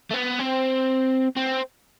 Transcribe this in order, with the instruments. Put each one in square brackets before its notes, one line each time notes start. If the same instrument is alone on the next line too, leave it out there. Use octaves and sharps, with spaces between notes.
[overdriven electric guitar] A3
B3
C4
C4